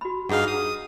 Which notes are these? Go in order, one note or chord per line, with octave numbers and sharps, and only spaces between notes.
F#4 B5
G2 D4 D#4 G#4 F5 F#5
D#6